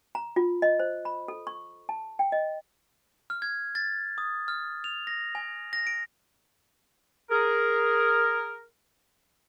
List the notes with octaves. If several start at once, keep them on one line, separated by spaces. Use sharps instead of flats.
A#5
F4
D#5
C5
B5
A4
C#6
A5
G5
D#5
F6
G#6
A6
D#6
F6
F7
A#6
G#5
A#6
D7
G#4 A#4